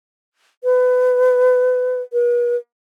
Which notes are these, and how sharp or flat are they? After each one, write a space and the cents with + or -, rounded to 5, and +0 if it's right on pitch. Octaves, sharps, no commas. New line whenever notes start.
B4 +25
B4 -45